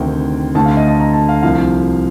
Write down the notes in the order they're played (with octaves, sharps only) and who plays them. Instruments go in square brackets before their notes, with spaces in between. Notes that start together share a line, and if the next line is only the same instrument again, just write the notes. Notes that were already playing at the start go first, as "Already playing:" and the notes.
Already playing: [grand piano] D2 C3 D#3 G5
D2 D3 A3 A5
F5
D#5
A5
A#5
A5
F5
C2 C3 F3 F5